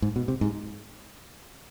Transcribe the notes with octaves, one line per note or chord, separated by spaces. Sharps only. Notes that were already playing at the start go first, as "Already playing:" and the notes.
G#2
B2
C3
G#2